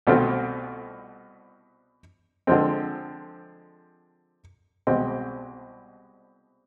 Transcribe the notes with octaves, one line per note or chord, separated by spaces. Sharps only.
C2 B2 A3 C4 F4
D3 F3 G#3 C4
C2 B2 G#3 C4